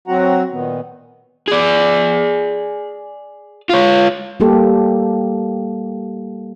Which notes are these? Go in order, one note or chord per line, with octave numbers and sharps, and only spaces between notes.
F#3 C4 F#4 F#5 A#5
A#2 D#3 B3
G#4 D5
F4 C#5
G3 A#3 G4 A4